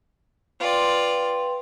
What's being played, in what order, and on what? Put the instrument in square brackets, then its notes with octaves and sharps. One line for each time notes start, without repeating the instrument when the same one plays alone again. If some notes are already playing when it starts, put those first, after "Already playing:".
[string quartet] F4 D5 [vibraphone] B4 G5 C6